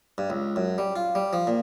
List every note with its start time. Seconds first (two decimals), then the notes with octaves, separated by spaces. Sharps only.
0.18 G2
0.30 C#2
0.56 F#2
0.78 G3
0.96 F4
1.15 G3
1.33 F3
1.47 A#2